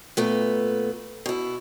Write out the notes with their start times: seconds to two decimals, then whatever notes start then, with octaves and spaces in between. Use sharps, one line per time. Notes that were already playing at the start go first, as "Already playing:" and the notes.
0.17 A#2 A3 B3
1.26 B2 E4